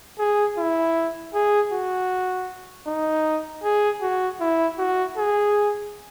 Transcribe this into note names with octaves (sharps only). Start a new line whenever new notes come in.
G#4
E4
G#4
F#4
D#4
G#4
F#4
E4
F#4
G#4